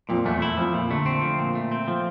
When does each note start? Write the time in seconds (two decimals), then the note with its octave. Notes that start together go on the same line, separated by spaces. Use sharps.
0.09 F2 A#2
0.25 E2 A3
0.42 E4
0.57 F2 F3
0.74 A#2
0.90 D3 A3
1.06 C4
1.22 F3
1.39 A#2
1.55 A3
1.72 C4
1.88 F3